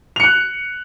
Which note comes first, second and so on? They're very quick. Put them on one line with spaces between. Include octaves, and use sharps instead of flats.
F7 C#7 F#6